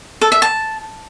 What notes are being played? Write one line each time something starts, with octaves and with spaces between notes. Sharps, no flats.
A4
E5
A5